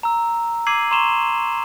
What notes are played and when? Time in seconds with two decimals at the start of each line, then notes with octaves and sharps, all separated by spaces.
0.03 A#5 E6
0.67 D6 E6 G#6 C7 D#7 F#7
0.91 A#5 C6 C#6 E7 F7 G7